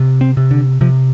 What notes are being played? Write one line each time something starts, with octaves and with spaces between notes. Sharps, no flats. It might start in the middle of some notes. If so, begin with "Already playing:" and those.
Already playing: C3
C4
C3
D3
C3 F3